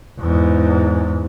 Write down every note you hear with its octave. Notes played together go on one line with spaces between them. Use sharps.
E2 G#2